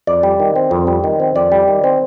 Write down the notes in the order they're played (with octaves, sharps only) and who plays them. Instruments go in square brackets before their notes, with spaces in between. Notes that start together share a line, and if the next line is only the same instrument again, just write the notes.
[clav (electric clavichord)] F2 D5
G3
D#3
C4
F2
G3
D#3
C4
F2 D5
G3
D#3
C4